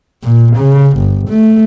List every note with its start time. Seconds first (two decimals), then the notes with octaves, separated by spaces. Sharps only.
0.23 A#2
0.57 C#3
0.98 G1
1.29 A3